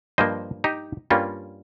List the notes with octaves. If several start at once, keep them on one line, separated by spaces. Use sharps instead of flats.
G2 F3 A#3 C5 D#5
D#4 G4
G2 G3 A#3 C#4 F4